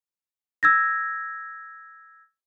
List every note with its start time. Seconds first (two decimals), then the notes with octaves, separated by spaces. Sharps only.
0.63 E6 G#6 A#6